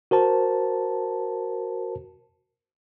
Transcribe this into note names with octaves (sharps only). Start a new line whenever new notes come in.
F#4 A#4 C5 A5